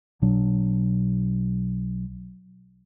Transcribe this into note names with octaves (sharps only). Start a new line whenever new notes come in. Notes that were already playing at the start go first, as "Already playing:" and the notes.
B1 B2 F#3 D4